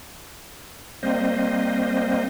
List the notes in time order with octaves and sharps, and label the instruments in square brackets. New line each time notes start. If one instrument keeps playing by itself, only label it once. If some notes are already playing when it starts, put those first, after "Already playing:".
[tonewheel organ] G3 A#3 C4 C5 D#5